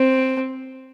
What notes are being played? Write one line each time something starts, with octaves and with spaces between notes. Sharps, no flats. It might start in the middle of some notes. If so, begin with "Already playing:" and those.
Already playing: C4